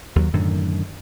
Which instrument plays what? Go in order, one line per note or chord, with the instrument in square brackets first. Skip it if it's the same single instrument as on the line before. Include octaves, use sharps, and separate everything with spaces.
[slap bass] D#2 F#3
F#2 A2 D3 D#3